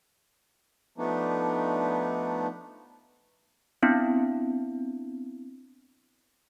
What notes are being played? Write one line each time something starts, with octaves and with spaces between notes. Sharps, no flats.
F3 A3 B3 D4 D#4
B3 C4 D4 E4